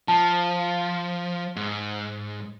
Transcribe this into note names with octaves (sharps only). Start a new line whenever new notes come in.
F3 A5
G#2